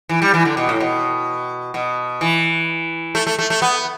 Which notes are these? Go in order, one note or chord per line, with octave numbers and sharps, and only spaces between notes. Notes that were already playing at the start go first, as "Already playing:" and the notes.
E3
G3
E3
D3
B2
A2
B2
B2
E3
A3
A3
A3
A3
B3